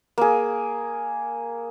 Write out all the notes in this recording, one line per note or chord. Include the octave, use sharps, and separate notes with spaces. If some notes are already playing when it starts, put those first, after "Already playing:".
A#3 G#4